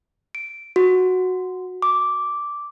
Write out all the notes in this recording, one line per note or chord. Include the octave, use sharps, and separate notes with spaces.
D7
F#4
D6